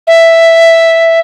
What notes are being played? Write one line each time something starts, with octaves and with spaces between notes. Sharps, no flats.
E5